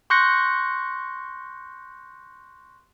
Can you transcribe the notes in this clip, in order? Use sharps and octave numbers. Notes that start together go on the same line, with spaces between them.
C6 C#6 F#6 G6 A#6 C#7